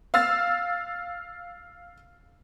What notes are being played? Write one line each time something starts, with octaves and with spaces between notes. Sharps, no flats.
F5 E6 F6 A6